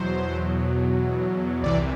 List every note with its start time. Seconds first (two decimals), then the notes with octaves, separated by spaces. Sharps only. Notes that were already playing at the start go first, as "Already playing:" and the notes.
Already playing: E2 B2 F#3 C5
1.63 C2 C3 E3 D5